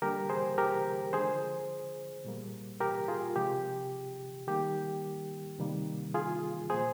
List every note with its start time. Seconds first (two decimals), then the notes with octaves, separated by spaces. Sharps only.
0.02 D3 G3 A#3 G4 A#4
0.30 G#4 C5
0.58 G4 A#4
1.13 D3 F3 G#3 G#4 C5
2.25 A#2 G3 A#3
2.80 G4 A#4
3.08 F4 G#4
3.36 C3 F3 G#3 G4
4.47 D#3 G3 A#3 G4
5.58 C3 D#3 G3 A#3
6.14 F4 G#4
6.70 A#2 F3 A#3 G#4 C5